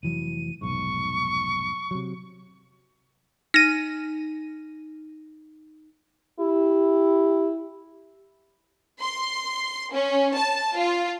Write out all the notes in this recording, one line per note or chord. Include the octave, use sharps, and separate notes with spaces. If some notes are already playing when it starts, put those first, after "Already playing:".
F1 E3 F#3 D#7
F1 B1 G#2 C#6
C3 F#3
D#4 A#6 D#7
E4 G4
C6
C#4
A5
F4